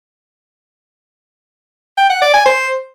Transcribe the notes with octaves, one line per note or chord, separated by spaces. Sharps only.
G5
F#5
D5
G#5
C5